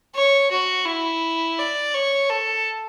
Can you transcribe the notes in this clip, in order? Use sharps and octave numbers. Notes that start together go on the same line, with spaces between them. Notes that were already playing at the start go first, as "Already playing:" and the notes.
C#5
F#4
E4
D5
C#5
A4